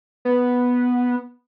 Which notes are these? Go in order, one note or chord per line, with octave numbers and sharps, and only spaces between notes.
B3